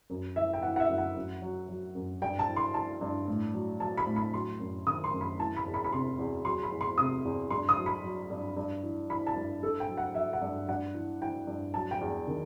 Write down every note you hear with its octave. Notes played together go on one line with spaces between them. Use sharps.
F#2
E3 E5
G5
E3 F#5
F#5
E5
F#2
F#5
F#2
F#3
F#3
F#2
G2 G5
A5
E3
C6
E3 A5
G2
A2
F#3
F#3 A5
B5
A2
B5
F#3 C6
F#2
D#3 D#6
C6
F#2
B5
E3 A5
B5
E2
B5
B5
C3 C6
E2
F#3 C6
B5
E2
C6
C3 D#6
E2
G2 C6
D#6
F#3
B5
F#3
G2
G2
E3
E3 B5
A5
G2
G2 A4
G5
F#3
F#5
F#3 E5
F#5
G2
G2 F#5
E3
E3 G5
G2
F#3 A5
G5
E2
D#3